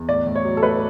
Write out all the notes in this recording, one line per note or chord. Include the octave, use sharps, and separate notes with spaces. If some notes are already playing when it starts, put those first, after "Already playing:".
Already playing: E2
A2 D5
A2
C#5
F#3
A4
A3 B4